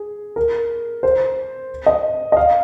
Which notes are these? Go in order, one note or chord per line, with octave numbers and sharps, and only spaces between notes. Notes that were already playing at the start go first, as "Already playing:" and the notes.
Already playing: G#4
A#4
C5
D#5
D#5
F5